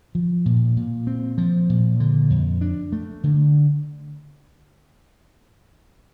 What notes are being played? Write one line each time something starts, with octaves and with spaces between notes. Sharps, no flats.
F3
A#2
A#2
C4
F3
A#2
D3
F2
D4
A3
D3